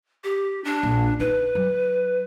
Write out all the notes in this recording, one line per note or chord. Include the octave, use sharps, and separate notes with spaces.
G4
D4
A#1
D#4 B4
F#3